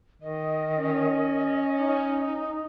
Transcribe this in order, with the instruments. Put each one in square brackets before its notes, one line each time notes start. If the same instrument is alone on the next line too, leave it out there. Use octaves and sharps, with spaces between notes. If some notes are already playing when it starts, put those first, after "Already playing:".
[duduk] D#3 [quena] D#5
[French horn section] C#4
[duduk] D#4